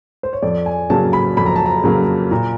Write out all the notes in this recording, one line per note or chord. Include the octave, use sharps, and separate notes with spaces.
C5
C#5
F2 D5
G#5
C#3 F#3 A#3 A5
B5
F2 B5
A#5
A5
A#5
C#3 F#3 A#3
A#2 A#5